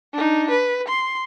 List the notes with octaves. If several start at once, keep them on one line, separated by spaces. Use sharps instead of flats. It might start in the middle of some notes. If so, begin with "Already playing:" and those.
D4 D#4
B4
C6